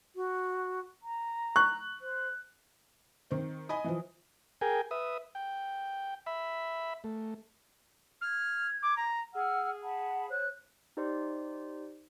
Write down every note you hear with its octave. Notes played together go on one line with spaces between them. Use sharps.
F#4
A#5
C#6 F#6
C5
D#3 C4
D#5 G#5 B5 D#6
E3 F3
G#4 A#4 G5 G#5
B4 E5 D#6
G5
E5 B5
A3
F6 G#6
D6
A#5
G#4 F#5 E6 F6
F#5 A5 B5
C5 C#5 F#6
D#4 G4 C5 D5 C6